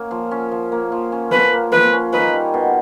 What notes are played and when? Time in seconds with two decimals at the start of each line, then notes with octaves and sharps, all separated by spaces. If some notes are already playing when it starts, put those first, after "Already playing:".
Already playing: A#3 C#4
0.11 F3
0.31 C#4
0.52 F3
0.72 A#3
0.92 F3
1.12 C#4
1.32 F3 B4
1.53 A#3
1.72 F3 B4
1.93 C#4
2.13 D#4 B4
2.33 G3
2.54 B2